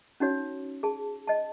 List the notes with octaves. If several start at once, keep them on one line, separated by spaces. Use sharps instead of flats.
C#4 D#4 F#4 C#5
G#4 A5
D#5 A5